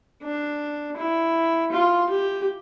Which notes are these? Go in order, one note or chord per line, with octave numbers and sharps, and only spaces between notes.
D4
E4
F4
G4